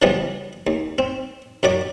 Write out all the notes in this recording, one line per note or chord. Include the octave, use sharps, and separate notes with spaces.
C#3 E3 F3 G3 B3
D#2
C4
F#2 F#3 D5 D6